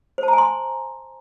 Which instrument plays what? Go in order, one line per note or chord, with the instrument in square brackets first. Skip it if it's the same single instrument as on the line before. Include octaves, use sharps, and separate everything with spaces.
[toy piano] C5
A5
A#5
G#5
C6